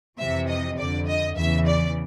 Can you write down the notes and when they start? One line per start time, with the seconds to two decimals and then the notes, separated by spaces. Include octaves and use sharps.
0.18 F2 C3 E3 E5
0.48 D#5
0.78 F2 D3 D5
1.07 D#5
1.37 E2 C#3 E3 E5
1.66 D5